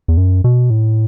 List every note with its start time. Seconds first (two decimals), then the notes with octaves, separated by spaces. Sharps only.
0.08 E2
0.17 F#2
0.44 B2
0.70 A2